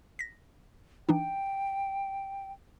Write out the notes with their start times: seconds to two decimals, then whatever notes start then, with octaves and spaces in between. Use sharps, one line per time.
0.19 A#6 B6
1.09 E3 D4 D#4 G5